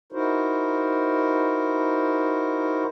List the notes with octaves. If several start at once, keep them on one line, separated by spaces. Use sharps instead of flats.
D#4 E4 F#4 A#4 C5